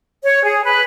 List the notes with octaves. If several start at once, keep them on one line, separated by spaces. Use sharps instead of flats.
C#5
G#4
B4